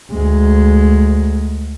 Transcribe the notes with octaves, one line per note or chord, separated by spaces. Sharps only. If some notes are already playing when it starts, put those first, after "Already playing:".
D2 G#3